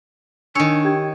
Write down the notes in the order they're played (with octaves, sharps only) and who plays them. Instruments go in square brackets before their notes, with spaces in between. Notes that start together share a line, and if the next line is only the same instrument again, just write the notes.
[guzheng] D#3 C#5 [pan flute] D4 [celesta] G#5 E6 C#7
[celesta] G4 G5 G#6